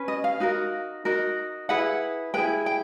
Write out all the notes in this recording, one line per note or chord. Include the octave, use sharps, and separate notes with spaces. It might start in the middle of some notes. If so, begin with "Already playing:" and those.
Already playing: C#4 B4
D#5
F5
D#4 F#4 A#4
D#4 F#4 A#4
E4 G#4 B4 F#5
E4 G#4 B4 G5
G5